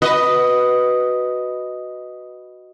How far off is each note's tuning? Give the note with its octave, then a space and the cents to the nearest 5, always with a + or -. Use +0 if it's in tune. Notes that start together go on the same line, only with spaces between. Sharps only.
F#4 +0 B4 +0 D#5 +0